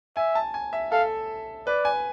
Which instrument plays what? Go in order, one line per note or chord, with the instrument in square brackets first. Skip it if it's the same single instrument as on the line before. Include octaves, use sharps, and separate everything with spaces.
[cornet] E5 [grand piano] G#5
[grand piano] A5
G#5
E5
[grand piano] A4 [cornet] F5
[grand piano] B4 [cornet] D5
[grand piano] G#5